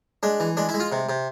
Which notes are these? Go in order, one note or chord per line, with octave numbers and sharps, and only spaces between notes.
G#3 D4
E3
G#3 D4
E4
G#3
F4
C3
C3